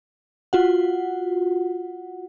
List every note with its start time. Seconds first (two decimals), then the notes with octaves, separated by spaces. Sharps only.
0.53 F4 F#4 F#5